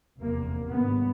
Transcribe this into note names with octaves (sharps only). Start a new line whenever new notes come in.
F1 E2 C3 A#3
G#1 G2 B3